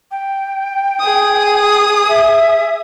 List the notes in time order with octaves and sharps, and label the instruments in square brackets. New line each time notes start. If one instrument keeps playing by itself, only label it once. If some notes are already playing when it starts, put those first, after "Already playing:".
[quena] G5
[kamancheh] G#4 D#6
[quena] E5